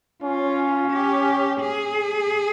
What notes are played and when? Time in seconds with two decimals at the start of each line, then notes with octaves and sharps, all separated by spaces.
0.23 C#4 F4
0.91 G4
1.60 G#4